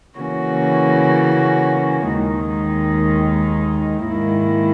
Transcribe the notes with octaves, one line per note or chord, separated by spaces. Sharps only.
C#3 E3 A#3 C#4 F#4
D#2 D#3 G#3 D#4
G#2 D#3 A#3 E4